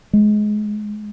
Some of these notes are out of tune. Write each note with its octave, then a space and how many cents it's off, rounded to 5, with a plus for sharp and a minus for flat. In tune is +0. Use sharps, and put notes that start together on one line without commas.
G#3 +20